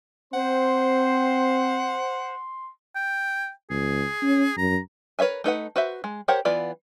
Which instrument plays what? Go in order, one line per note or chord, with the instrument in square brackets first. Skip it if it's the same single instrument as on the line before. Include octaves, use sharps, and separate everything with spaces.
[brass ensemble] C4 [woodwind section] C5 [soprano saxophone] F#5 [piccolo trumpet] C6
[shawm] G5
[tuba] C#2 [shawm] G#4
[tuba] C#4
[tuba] F#2 [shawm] A#5
[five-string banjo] A#4 B4 C#5 E5 G#5
A3 D#4 B4 F#5
F#4 B4 C5 E5
G#3
G4 A#4 C5 C#5 F#5
E3 B3 F4 D5 B5